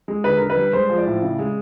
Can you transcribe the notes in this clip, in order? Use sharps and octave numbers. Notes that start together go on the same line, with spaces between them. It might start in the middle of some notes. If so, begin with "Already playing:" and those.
G#3
D3 B4
D3 A#4
B4
G3
G#3 C5
F3
D5
A2
C#3
G#3